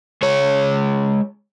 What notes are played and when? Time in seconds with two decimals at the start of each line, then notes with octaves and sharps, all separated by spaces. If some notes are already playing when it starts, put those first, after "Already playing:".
0.23 G#3 C#5